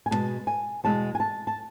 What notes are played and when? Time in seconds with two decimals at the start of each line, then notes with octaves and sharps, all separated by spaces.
0.06 G#5
0.11 E2 B2 G#3 A5
0.47 G#5
0.84 E2 B2 G#3 A5
1.15 G#5
1.20 A5
1.47 A5